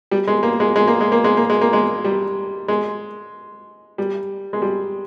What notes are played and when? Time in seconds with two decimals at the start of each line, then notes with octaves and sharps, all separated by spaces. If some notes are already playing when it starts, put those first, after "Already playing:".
0.12 G3
0.27 G#3
0.43 A#3
0.60 G#3
0.76 G#3
0.88 A#3
1.01 G#3
1.12 A#3
1.24 G#3
1.37 A#3
1.50 G#3
1.61 A#3
1.73 G#3
2.05 G3
2.68 G#3
3.98 G3
4.53 G#3
4.62 G3